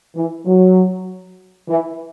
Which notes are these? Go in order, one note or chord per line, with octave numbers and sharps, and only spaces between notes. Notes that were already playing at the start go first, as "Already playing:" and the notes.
E3
F#3
E3